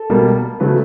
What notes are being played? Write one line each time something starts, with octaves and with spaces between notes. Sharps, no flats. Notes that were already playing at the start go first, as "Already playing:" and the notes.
Already playing: A4
B2 G3 A#3
C#3 F#3 A3 B4